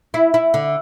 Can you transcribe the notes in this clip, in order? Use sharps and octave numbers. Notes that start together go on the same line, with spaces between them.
E4
E4
D3